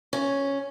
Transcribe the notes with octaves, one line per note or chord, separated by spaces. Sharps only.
C#4